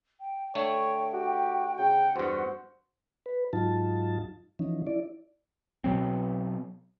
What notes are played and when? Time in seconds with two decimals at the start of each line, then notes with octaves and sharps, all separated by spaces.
0.20 G5
0.55 D3 A3 C#5 G5
1.14 F#4 G4
1.78 C#3 F#5 G5
2.16 E2 G2 F#4 C5
3.26 B4
3.53 G#2 F#3 D#4 F4 A5
4.59 E3 F3 C#4 D#4
4.87 E4 D5
5.84 B2 F#3 C4